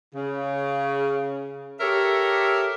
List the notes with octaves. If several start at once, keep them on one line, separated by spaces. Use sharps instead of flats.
C#3
G4 A4 A#4 C#5 E5